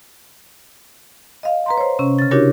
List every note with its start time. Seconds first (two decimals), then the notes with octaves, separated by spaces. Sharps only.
1.43 D#5 F5
1.66 B4 A#5 C6
1.78 C5 C#5
1.99 C3 C#4
2.19 C#3 A6
2.31 D4 E4 F#4 G4 A#4 C#5